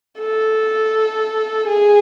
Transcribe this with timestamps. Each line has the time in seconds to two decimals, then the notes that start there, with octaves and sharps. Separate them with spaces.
0.19 A4
1.68 G#4